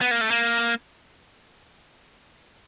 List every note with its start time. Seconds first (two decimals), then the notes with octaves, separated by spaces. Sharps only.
0.01 B3
0.11 A#3
0.21 A3
0.31 A#3